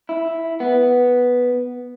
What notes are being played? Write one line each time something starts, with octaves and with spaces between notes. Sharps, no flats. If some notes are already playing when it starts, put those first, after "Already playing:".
E4
B3